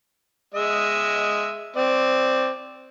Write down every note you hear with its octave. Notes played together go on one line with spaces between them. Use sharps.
G#3 D#5 E5
C4 D5